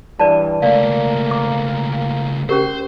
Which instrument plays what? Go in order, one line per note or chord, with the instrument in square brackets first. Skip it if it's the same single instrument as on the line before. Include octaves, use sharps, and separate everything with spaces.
[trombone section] G2 E3 [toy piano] B4 D5 A5
[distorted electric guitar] C#2 A3 [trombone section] A#3 [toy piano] D5 F5
[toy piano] D6
[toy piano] C#4 G4 A#4 [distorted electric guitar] C5